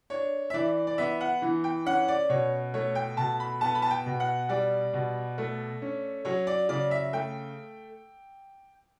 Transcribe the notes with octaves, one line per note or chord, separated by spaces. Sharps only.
D4 C#5
E5
E3 D5
D5
B3 E5
F#5
E3
G5
C#4 F#5
D5
B2 C#5
A3 C#5
G5
B2 A5
B5
B3 A5
B5
A5
G5
B2
F#5
G3 D5
B2
A3
C#4
F#3 C#5
D5
C#3 D5
E5
A3 G5